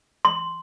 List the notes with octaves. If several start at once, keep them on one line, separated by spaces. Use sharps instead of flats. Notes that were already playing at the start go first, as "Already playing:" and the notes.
C6